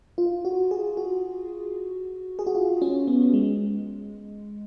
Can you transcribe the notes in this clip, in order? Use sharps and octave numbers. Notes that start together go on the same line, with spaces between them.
F4
F#4
G#4
F#4
G#4
F#4
F4
C#4
B3
G#3